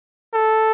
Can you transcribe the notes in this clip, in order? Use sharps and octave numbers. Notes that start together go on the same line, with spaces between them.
A4